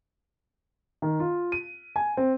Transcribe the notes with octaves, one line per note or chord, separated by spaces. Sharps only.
D#3
F4
D#7
G#5
C4